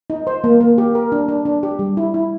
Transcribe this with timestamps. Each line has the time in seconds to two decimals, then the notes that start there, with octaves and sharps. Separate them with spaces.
0.10 D#4
0.27 C5
0.44 A#3
0.61 A#3
0.78 G4
0.95 A#4
1.12 D4
1.28 D4
1.45 D4
1.63 G4
1.79 G3
1.97 E4
2.14 E4